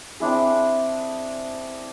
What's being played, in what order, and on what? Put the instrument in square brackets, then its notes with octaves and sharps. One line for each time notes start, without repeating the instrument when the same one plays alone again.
[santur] C4 D4 E4 G#4